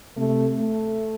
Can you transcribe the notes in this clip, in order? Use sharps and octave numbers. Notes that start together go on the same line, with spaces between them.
C3 A3
A3